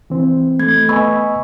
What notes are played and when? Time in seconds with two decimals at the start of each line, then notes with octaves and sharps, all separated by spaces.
0.10 E3 C4
0.59 A3 G#6
0.89 B3 D#5 G#5 B5 C#6 E6